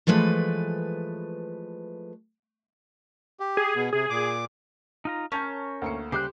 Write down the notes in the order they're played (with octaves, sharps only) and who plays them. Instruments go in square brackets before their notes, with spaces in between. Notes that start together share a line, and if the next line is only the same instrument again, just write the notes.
[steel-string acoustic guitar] E3 F3 G#3 A3 B4
[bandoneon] G4
[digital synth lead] G#4
[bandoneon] B2 B3
[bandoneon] C3 [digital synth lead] G#4
[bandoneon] A#2 D6
[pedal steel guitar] D#4 F4 A#5
[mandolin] C#4 [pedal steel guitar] A#4 C#5 [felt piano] A5 G6 G#6
[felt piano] D2 A#3 C#7
[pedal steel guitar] C#3 G3 F#6 [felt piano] G4 D6 [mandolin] C5